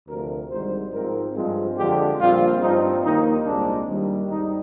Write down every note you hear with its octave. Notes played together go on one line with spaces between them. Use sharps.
D2 C3 F3 A#4
G#1 G#2 G3 C5
G#2 F3 C4 A#4
G2 F3 G#3 C4 G#4
F2 D3 F3 G#3 G4
A#1 A#2 G3 C4 F4
G2 F3 C4 D#4
D#2 D#3 A#3 D#4
C2 A#2 G#3 C4 D4
D#2 D#3 G3
G#1 G#2 G3 D#4